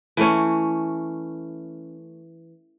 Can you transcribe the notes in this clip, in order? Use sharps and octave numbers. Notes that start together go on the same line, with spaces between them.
E3 A3 C#4